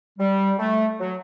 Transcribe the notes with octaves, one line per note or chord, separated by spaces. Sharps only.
G3
A3
F#3